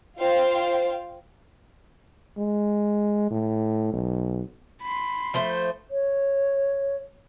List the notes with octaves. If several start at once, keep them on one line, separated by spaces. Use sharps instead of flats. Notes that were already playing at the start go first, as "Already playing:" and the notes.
F4 C5 F5 G5
G#3
A2
B1
B5 C6
F3 A3 C5
C#5